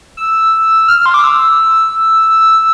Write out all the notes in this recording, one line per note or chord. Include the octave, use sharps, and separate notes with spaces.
E6
F6
C6
D6
E6